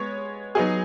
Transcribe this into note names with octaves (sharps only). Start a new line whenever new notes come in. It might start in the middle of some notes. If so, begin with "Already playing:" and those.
Already playing: G#3 B3 C#5
F#3 B3 D#4 G#4